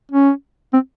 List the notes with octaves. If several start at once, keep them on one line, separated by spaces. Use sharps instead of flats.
C#4
C4